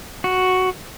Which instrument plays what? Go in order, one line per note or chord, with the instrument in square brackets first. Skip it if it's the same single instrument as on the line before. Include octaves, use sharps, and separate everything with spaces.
[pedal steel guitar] F#4